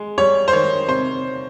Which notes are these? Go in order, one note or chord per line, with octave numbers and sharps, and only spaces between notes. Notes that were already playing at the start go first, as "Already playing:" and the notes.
Already playing: G#3
G3 C#5
C5
D#3 C#5
C3 C5